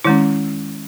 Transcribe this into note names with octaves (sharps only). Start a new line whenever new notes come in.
D#3 G#3 C#4 E4